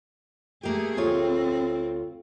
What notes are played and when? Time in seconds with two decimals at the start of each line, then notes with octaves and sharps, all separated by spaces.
0.63 A3 A#3 G4 G#4
0.97 D2 C4 F4 C#5